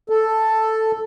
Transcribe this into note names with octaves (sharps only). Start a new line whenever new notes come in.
A4